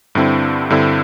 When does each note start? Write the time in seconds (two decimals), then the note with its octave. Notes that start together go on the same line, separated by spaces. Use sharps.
0.15 G2 D3 C4 E4
0.70 G2 D3 C4 E4